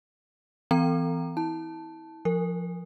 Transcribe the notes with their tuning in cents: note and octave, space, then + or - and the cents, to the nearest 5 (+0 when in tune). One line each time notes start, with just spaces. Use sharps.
E3 +0 C4 -35 A#5 +0
E4 -25 A5 +0
F3 +0 A#4 -30